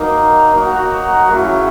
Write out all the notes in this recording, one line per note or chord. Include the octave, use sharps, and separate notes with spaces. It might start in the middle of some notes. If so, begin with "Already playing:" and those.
Already playing: F#3 A#3 D#4
F#3 A#3 D#4 F#4
C#3 F#3 A3 C#4 E4